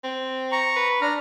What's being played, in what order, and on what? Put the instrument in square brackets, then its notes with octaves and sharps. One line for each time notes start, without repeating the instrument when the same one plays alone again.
[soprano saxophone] C4
[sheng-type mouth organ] A#5 C#6
[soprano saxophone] B4
[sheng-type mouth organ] D4 F6 [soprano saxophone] A#5